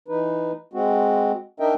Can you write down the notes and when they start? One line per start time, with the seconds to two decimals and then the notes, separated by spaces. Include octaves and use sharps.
0.08 E3 D#4 B4
0.73 G#3 C4 F#4
1.60 D4 D#4 A#4 D#5 E5 G5